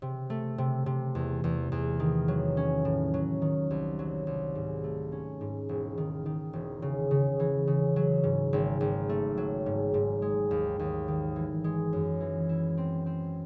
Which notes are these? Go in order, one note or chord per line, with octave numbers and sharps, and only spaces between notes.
C3
A3
C3
C3
E2
E2
E2
D#3
F#3
C#4
A2
F#3
D#3
C2
F#3
C2
G#2
A3
C#4
G#2
E1
D#3
D#3
E1
C#3
C#3
E3
C#3
F#3
G#2
G#1
G#1
A3
F#3
G#2
G#2
G#3
D#2
D#2
D#3
E3
G#3
F#2
E3
E4
C4
C4